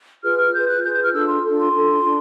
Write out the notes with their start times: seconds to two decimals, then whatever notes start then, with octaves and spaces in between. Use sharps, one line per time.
0.23 F4 G#4 B4 F6
0.38 F6
0.54 F4 G#4 B4 G6
0.68 F#6
0.83 F4 G#4 B4 G6
0.94 G6
1.03 F6
1.13 D4 F4 A4 E6
1.29 C6
1.43 D4 F4 A4
1.59 C6
1.74 D4 F4 A4
2.04 D4